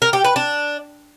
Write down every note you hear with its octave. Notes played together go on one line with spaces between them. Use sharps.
A#4
G4
B4
D4